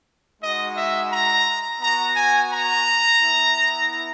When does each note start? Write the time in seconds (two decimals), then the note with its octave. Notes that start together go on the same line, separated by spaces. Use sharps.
0.41 G#3 D#4 F#4 D#5
0.76 E5
1.11 A#5
1.80 B3 F#4 A#5
2.16 G#5
2.50 A#5
3.20 B3 E4